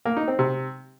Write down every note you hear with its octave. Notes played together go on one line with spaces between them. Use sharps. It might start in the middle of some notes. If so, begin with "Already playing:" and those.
A#3
D#4
C4
C3